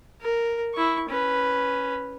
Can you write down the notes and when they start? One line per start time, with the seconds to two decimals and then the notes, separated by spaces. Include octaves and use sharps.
0.21 A#4
0.74 E4 C#6
1.09 C#4 B4